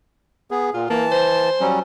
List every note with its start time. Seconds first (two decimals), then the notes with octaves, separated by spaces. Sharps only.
0.51 B3 G#4
0.74 A#2 F4
0.90 E3 A#3 A5
1.11 C5
1.61 F#3 G3 C#4